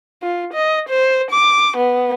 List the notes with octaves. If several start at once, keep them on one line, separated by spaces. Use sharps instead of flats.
F4
D#5
C5
D6
B3